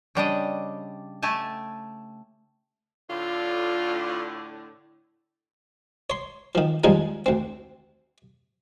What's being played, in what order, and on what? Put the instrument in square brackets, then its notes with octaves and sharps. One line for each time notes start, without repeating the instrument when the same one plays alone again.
[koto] C#3 G3 D4 D#5
A3 G4 G#5 A5
[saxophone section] A2 D3 [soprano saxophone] F4
[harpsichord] C#5 C6
D#3 F3
D#2 F3 G3 G#3 D#4 G#5
D2 C4